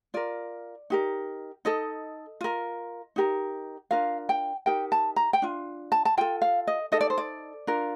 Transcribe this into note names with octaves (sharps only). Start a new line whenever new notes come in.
F4 A#4 D5
D#4 G4 A#4
D#4 A4 D#5
F4 A#4
D#4 G4 A#4
D4 F4 A#4 F5
G5
D#4 G4 A#4 G5
A5
A#5
G5
D4 F4
A5
A5
F4 A4 G5
F5
D#5
D#4 A4 D#5
D5
C5
D5
D4 F4 A#4